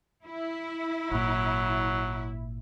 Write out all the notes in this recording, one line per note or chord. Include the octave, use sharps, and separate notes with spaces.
E4
G#1 A#2 F#3